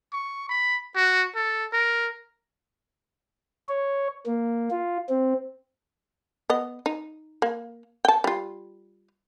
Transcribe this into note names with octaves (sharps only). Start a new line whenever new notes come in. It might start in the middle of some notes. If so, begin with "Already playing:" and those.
C#6
B5
F#4
A4
A#4
C#5
A#3
F4
C4
B3 D#5
D#4
A#3
G5 A5
G3 F4